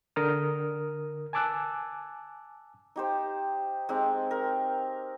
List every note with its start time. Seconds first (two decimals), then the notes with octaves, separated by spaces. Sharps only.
0.16 D3 A#4 D#6 F6
1.33 G#5 A5 D6 E6 F#6
2.96 D#4 G4 C5
3.89 G#3 C4 D#4 G4
4.31 A#4